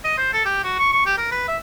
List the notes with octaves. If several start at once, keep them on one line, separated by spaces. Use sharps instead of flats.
D#5
C5
A4
G4
F#4
C#6
C#6
G4
A#4
B4
E5